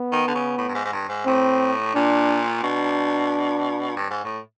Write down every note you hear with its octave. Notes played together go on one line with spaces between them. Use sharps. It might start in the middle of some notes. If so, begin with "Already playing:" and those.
Already playing: B3
D#3
D3
C#3
A2
G2
G#2
G#2
G2
G#2
A2 C4
A#2 D4
B2 D4
G2
G#2
A2